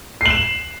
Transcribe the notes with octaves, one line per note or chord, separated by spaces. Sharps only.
C7 E7 F#7